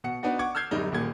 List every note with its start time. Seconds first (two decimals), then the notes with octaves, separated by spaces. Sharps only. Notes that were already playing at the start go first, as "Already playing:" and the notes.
0.04 B2 F#5 C#7
0.23 B3 D4 D#4 F#4
0.39 F#5 C#6 D6 G#6
0.55 E6 F6 G6 G#6 C7
0.71 D1 F#2 G3 D#4
0.92 D#1 A#2 G#6